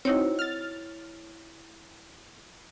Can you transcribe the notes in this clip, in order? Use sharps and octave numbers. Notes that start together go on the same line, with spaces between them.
C4 D#4 E4 F#4 C#5
F6 A6